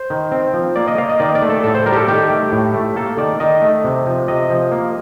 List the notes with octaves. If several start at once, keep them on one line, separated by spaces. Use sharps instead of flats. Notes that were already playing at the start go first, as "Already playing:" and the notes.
Already playing: C5
D#3
C4
F3
A#3 D5
D#5
A#3 F5
D#5
D#3 D5
D5
A3
A4
A2 A4
C5
G3 A#4
G4
A4
D#3 G4
A3
A2
A3
A#3 A4
D#3 D5
D#3 D#5
A3
C3
F3
C3 D#5
F3
A#3